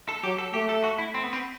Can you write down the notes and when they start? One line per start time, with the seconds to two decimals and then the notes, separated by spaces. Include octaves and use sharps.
0.09 A4
0.24 F#3 G4
0.38 A4
0.54 A3 G4
0.69 A4
0.84 F#4
0.98 E4
1.14 C4
1.23 B3
1.33 C4